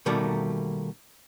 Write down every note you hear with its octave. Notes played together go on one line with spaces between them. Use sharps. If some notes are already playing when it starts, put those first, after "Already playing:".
B2 D#3 G3 A3 A#3 F#4